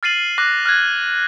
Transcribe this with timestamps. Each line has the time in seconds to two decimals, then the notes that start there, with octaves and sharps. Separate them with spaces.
0.03 F6 A6 C7 D#7 F#7
0.38 D6 F#6 A#6
0.66 F6 F#6 G#6